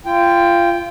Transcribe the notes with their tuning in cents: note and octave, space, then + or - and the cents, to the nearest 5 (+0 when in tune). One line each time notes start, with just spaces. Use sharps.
F4 -25 G5 +5